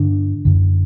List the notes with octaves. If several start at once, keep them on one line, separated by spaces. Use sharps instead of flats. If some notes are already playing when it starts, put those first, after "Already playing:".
Already playing: G2 D3 D4
F#2 D3